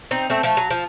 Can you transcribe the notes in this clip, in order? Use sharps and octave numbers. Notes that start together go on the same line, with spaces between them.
C4 D#4
A3 C4
F3 A3
F#3
F3